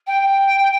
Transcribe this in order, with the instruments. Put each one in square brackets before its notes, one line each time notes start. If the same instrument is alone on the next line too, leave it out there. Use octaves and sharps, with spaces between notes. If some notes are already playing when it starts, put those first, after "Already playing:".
[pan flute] G5